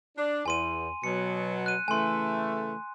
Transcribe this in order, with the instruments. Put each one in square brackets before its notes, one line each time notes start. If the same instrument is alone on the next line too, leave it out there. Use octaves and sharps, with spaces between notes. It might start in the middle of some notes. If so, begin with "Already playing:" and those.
[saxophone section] D4
[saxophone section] E2 [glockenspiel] G#5 C6 D#7
[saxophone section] B2 F#3 [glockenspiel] C#7
[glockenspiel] F#6 D#7
[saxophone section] C#3 E3 A3 [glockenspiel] G#5 C6